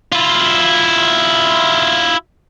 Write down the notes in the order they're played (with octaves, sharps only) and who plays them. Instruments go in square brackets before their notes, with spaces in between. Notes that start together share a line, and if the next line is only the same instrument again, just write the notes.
[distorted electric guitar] E4 F4